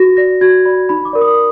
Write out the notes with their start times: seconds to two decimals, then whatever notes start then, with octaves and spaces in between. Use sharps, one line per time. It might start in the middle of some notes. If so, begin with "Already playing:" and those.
Already playing: F#4 A#6
0.17 D5 A#6
0.41 F#4 G#6
0.65 D5 B5
0.89 D#4 B5
1.05 D6
1.13 A#4 D5
1.21 D#6